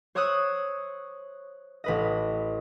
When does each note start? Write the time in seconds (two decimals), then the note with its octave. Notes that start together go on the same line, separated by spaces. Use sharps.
0.15 C5 C#5 C#6 D#6 E6 F#6
1.84 A1 B4 D#5